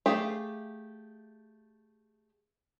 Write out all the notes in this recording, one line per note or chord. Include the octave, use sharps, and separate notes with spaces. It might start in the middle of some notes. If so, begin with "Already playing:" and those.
A3 G4 G#4 E5 F5